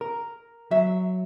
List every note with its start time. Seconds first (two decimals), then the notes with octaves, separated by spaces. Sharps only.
0.01 A#4
0.71 F#3 E5